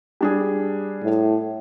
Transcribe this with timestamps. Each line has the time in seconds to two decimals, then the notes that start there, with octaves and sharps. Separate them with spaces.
0.21 G3 D4 G#4
1.03 A2